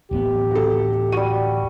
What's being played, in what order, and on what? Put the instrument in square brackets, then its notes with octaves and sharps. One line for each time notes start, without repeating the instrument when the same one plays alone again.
[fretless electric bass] D1 A1 B3 [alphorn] G4
[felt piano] F#4 A4
[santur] G3 F#4 [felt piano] D#7